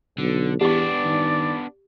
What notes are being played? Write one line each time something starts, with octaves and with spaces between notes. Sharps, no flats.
B1 D3
E2 B3 D4 G4 D5 C#6
D#3